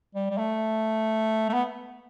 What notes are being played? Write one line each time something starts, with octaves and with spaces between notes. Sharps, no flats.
G3
G3
A3
A3
B3